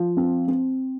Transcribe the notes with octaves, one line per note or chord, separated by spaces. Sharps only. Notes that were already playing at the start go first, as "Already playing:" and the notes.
Already playing: F3
C4
C4